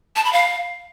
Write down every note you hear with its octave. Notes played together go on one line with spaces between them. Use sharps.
A5
B5
F5